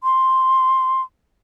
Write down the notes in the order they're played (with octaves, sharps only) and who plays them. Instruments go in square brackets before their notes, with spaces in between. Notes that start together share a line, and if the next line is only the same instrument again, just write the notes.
[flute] C6